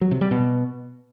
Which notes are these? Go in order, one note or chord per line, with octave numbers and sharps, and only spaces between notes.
F#3
C3
G3
B2